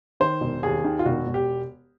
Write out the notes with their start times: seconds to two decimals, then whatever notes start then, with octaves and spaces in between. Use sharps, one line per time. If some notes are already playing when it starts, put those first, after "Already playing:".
0.20 D#3 C5
0.41 E1
0.63 D#2 G#4
0.84 D#3
0.99 F4
1.05 E1 F#4
1.27 E1
1.34 G4